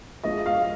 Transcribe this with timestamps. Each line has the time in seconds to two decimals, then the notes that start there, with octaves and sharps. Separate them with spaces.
0.24 F3 G#3 F4 D#5
0.46 F5